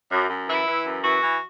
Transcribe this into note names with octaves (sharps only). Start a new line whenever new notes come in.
F#2
F#2
E3 E4
E3
F#2
E3 F#4
E3